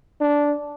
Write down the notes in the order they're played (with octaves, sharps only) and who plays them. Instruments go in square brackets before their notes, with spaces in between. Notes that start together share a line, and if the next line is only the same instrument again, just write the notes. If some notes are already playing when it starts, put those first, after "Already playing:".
[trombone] D4